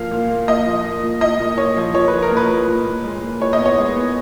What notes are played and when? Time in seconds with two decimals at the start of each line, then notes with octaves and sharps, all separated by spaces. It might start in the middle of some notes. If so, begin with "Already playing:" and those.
Already playing: F3 A#3 F5
0.11 A#2
0.30 A#3
0.48 A#2 D#5
0.66 F3
0.85 A#3
1.03 A#2
1.21 A#2 D#5
1.39 A#2
1.58 A#2 C#5
1.77 F3
1.94 F3 C#5
2.08 B4
2.13 F3
2.23 A#4
2.31 A#2
2.37 B4
2.50 A#2
2.68 A#2
2.86 A#2
3.04 G#3
3.23 A#2
3.41 A#2 C#5
3.53 D#5
3.59 B3
3.66 C#5
3.78 G#3
3.96 B3